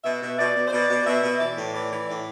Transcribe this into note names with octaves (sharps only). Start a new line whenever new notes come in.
B2 E5
B2
B2 D5
B2
C5
B2 D5
B2
B2 E5
B2
E3 D5
A2
E3 D5
E3
A2 D5